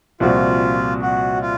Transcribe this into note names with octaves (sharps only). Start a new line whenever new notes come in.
C2 A#2 F3 C4 F4 F#4
F#4
F4